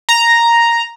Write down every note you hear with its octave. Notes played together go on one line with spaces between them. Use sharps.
A#5